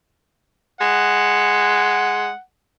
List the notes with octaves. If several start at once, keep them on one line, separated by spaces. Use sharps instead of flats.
G#3 F#5